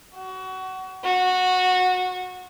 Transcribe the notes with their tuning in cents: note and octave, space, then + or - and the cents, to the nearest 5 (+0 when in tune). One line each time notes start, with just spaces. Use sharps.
F#4 +25
F#4 -15